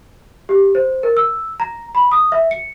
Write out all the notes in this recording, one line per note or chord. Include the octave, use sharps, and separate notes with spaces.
G4
C5
A#4
E6
A#5
B5
D#6
E5
C#7